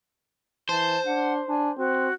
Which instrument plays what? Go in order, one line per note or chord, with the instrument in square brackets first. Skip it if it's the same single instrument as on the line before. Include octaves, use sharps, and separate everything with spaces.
[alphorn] E3 [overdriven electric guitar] C5 [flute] A5
[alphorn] D4 [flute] F#5
[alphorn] D4 [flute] G#5
[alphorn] C4 [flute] F#4